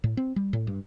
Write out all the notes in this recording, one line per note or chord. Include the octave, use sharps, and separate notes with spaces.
A2
C4
G3
A2
G2